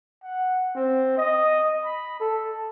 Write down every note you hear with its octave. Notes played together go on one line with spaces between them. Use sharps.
F#5
C4
D#5
B5
A4